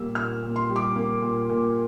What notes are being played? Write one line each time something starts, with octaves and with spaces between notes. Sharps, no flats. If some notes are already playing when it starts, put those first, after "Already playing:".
Already playing: A#2 G3 A#3 E6
A#2 F6
A#2
C6
G3
D6
A#3
A#2
A#2